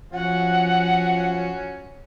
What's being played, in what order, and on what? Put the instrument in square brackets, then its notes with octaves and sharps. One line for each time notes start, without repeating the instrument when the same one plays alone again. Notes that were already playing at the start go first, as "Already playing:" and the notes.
[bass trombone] F3 [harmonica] C#4 F#4 [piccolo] F#5